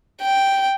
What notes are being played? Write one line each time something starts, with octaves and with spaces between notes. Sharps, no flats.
G5